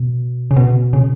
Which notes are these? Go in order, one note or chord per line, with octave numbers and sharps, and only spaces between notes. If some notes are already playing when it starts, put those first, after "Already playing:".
Already playing: B2
C#3
B2
C#3